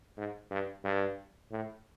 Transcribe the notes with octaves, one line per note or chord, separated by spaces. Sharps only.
G#2
G2
G2
A2